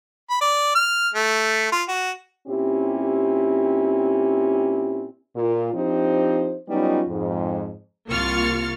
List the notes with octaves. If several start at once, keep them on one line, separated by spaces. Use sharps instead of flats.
B5
D5
F6
A3
F4
F#4
A#2 C4 C#4 E4 G4
A#2 F4
F3 C4 D4 D#4 G4 C5
F#3 G3 B3 C#4 D#4 F4
F2 G#2
C2 A#3 F4 C#6 F6 A6